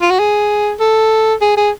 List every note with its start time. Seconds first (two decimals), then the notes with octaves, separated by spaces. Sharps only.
0.01 F4
0.10 F#4
0.19 G#4
0.80 A4
1.41 G#4
1.57 G#4